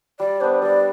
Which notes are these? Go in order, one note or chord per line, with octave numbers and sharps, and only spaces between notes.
G3 D5
B3 D4 C5
G3 D5